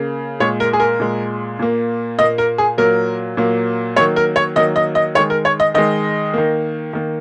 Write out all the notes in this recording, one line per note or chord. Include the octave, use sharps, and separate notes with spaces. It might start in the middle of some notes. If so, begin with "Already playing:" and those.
Already playing: C#3 A#3
A#2 G#3 C#5
A#4
G#4
A#4
A#2 G#3
A#2 A#3
A#2 A#3 D#5
A#4
G#4
A#2 F#3 A#3 A#4
A#2 F#3 A#3
D#3 F#3 A#3 C#5
A#4
C#5
D#3 F#3 A#3 D#5
D#5
D#5
D#3 G#3 C#5
A#4
C#5
D#5
D#3 G#3 D#5
D#3 A#3
D#3 A#3